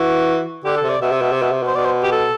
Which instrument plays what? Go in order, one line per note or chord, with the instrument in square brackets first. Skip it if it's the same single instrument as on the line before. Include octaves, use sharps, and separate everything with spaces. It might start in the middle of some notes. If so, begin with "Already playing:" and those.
Already playing: [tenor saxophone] E3 [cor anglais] F#4
[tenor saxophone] D3 [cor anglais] G4
[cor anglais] A4
[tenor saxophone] C3
[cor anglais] D5
[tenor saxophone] B2 [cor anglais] E5
[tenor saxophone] C3
B2
C3
B2
C3
B2
[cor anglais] C5
[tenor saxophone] B2 [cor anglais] D5
[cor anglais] C5
G4
A4